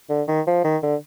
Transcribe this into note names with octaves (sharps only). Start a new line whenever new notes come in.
D3
D#3
F3
D#3
D3